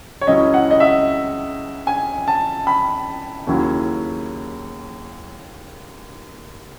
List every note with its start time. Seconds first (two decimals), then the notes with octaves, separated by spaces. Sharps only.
0.21 C#5
0.27 C#2 C#3 F#3 C#4 E4 D#5
0.54 F#5
0.71 D#5
0.80 E5
1.87 G#5
2.28 A5
2.67 B5
3.47 D#2 C#3 F#3 C#4 E4